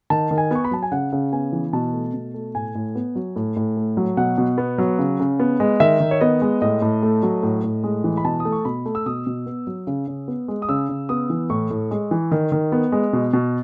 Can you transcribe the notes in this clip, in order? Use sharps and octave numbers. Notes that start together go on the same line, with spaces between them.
D#3 A5
D#3
G#5
B3 C#6
B5
F#3 A5
G#5
C#3 F#5
C#3
B3 G#5
E3
B2 A5
A3
B2
A3
A2 G#5
A2
B3
F#3
A2
A2
A3
F#3
B2 F#5
B2
B3
F#3
C#3
C#3
B3
G#3
D#3 E5
D#3
C#5
B3 D#5
G#3
A2 D#5
A2
A3
F#3
A2
A2
G#3
E3
B5
B2 A5
D#6
A3
C#6
B2 B5
A3
E6
B2 D#6
B2
B3
F#3
C#3
C#3
B3
G#3
D#6
C#3 E6
C#3
B3 D#6
E3
A2 C#6
A2
G#3
E3
D#3
D#3
B3
G#3
B2
B2